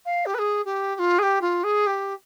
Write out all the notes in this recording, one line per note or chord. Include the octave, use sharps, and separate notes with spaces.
F5
G4
B4
G#4
G4
G4
F4
G#4
G4
F4
G#4
G4